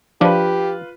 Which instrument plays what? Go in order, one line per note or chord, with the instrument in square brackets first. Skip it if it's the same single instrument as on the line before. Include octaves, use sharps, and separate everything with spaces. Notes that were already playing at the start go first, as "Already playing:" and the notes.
[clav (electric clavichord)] F3 D4 [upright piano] F4 B4 [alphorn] G4